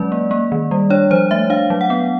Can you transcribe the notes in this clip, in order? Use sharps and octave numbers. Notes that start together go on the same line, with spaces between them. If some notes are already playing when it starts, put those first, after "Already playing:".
Already playing: F#3 G#3 C#4 D5
A#3
A#3
D#3
G3
D4 C#5
F3 C5
A3 E5
D4 F5
F#3
F#5
B3